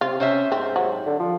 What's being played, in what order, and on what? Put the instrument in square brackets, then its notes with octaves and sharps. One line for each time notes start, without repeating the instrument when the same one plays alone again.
[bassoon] C3 [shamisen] F4
[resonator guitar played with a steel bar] C3 C5 E5 [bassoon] C#4
[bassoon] G#2 [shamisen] C4
[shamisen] F#3
[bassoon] D3
F3